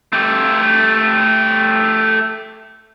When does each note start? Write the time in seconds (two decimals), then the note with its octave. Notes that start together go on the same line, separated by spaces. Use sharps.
0.13 A3 G4